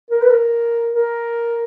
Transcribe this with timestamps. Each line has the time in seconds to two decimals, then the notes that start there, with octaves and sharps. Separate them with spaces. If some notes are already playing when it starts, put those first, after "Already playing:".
0.10 A#4
0.21 B4
0.30 A#4
0.93 A#4